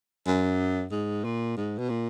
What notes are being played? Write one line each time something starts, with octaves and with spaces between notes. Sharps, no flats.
F#2
G#2
A#2
G#2
B2
A#2